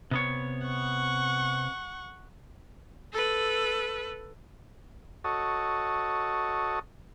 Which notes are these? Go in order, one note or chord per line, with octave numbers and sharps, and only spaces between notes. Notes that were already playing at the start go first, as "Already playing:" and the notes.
C3 B3 C#5
F#5 C#6
A4 B4
F#4 A4 C#5 D#5